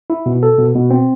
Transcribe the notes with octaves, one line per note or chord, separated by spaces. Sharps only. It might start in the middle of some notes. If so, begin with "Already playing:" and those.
E4
B2
A4
B2
B2
C4